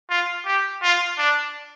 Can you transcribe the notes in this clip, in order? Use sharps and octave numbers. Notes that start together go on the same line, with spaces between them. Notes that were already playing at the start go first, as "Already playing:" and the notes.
F4
G4
F4
D4